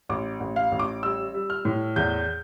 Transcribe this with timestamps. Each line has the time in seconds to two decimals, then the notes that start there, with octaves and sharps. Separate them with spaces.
0.09 A1 D6
0.40 A1
0.56 F5
0.72 A1
0.79 D6
1.03 G3 E6
1.34 G3
1.50 F6
1.65 A2
1.96 E2 G6